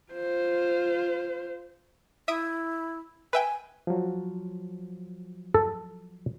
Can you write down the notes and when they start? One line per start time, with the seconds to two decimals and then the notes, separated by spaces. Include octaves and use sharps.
0.12 F4 C5
2.28 E4 E5 D#6 D7
3.33 B4 E5 G5 G#5
3.87 F3 F#3
5.54 A4